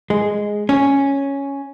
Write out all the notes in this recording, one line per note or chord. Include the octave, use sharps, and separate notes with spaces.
G#3
C#4